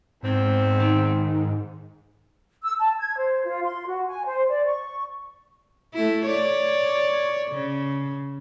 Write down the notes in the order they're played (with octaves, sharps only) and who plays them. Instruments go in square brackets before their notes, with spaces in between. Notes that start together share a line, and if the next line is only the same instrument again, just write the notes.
[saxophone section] E2 C4 [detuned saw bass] G#2
[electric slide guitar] D#3
[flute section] E6
A5
G#6
C5
F4
C6
F#4
G#5
C5
D5
C#6
[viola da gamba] A3 E4
C#5 D5
C#3